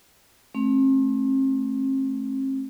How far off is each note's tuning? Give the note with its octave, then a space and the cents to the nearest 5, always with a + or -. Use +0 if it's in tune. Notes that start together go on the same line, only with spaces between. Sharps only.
A3 -15 C4 +40